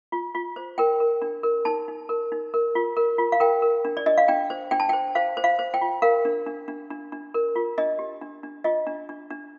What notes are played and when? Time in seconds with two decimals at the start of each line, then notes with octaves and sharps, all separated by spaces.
0.12 F4
0.35 F4
0.56 C5
0.78 A#4 G5
1.00 A#4
1.22 D4
1.43 A#4
1.65 D#4 A5
1.88 D#4
2.09 A#4
2.32 D#4
2.54 A#4
2.75 F4
2.97 A#4
3.18 F4
3.32 F5
3.40 A#4 G5
3.62 A#4
3.85 D4
3.97 D5
4.06 D4 D#5
4.18 F5
4.28 D4 G5
4.50 C5
4.71 D4 G5
4.80 A5
4.89 G5
4.93 C5
5.15 C5 F5
5.37 C5
5.44 F5
5.59 C5
5.74 G5
5.81 F4
6.02 A#4 F5
6.25 D4
6.47 D4
6.68 D4
6.90 D4
7.12 D4
7.34 A#4
7.56 F4
7.78 D4 D#5
7.99 G4
8.21 D4
8.43 D4
8.64 F4 D#5
8.87 D4
9.09 D4
9.30 D4